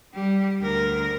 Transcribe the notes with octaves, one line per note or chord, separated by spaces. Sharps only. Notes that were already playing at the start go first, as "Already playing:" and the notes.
G3 G4
D2 A#4